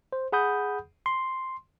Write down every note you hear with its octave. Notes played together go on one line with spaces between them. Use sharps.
C5
G#4 F#5 B5 D#6 G6
C6